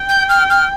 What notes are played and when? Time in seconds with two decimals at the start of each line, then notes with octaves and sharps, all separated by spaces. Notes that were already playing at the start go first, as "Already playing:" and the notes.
Already playing: G5
0.09 G6
0.29 F6
0.50 F6